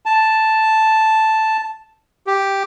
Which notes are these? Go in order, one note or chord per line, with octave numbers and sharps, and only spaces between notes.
A5
G4